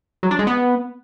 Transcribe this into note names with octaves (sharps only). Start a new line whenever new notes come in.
F#3
D4
G#3
B3